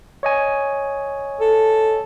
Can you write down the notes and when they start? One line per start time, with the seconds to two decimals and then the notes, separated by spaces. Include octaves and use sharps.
0.23 C#5 D#5 G#5
1.41 A4